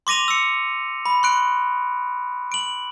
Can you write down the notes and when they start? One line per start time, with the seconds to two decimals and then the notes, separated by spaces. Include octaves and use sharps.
0.07 C6 D6 A#6 D#7 F7
0.28 E6 C#7
1.06 B5
1.23 C6 F#6 D7
2.52 D7 F#7